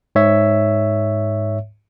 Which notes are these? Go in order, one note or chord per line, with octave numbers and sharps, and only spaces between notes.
G#2 C#5 E5